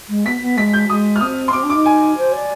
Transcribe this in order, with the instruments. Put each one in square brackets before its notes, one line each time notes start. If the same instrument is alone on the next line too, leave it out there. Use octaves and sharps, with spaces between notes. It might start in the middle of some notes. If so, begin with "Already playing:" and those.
[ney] G#3
[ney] B3 [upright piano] B6
[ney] B3
[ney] G#3 [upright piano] B6
[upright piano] G6
[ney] G#3 [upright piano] D#6
[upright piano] F6
[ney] C4 [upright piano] D#6
[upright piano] C6
[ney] C4 [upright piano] D6
[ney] D4
[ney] D#4 [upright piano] D6
[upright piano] G#5
[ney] C5
D5